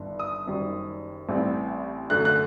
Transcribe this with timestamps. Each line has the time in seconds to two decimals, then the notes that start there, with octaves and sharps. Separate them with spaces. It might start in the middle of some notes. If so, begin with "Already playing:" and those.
Already playing: G1 G2 D#3
0.19 D#6
0.47 F#1 F#2 D#3 G3
1.29 A1 A2 G3 C4
2.10 F#2 D3 A3 F#6
2.25 F#6